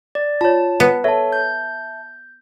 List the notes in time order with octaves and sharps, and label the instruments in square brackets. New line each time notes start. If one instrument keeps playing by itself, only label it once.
[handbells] D5
[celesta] F4 C#5 [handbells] A5
[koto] B3
[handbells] A4 C#5 [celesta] E5 A5
[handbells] G6